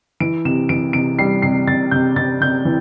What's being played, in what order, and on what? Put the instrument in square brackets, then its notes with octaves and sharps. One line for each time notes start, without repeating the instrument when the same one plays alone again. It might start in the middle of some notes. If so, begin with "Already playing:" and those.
[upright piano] E3 D7
C3 E7
E3 D7
C3 D7
G3 C7
C3 C7
C3 A6
C3 G6
C3 A6
C3 G6
E3